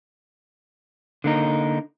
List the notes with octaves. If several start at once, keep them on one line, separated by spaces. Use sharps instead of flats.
D3 A#3 D#4